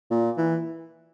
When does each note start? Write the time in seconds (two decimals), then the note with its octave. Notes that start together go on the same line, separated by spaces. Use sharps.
0.10 A#2
0.38 E3